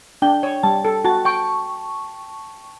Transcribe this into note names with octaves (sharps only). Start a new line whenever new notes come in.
D4 G5
C#5
G3 A5
A4
F#4 A5
G5 C#6